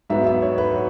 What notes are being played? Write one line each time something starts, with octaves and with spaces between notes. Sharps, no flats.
G#2 F#3 B3 E5
E5
C#5
B4
F#3 F#4